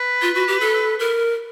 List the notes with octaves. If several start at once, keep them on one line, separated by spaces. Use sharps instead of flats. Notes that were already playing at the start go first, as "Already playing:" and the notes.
Already playing: B4
F4
F#4
G4
A4
A#4